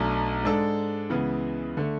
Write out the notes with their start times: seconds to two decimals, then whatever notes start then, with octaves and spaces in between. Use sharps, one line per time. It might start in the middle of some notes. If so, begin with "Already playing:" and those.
Already playing: B1 B2 A3 D4
0.43 G#2 G#3 D4 A4
1.09 C#2 C#3 E3 B3
1.77 D3 A3